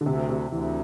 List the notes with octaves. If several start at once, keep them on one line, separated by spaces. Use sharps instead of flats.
D3
D2 C3
C3
D2 E3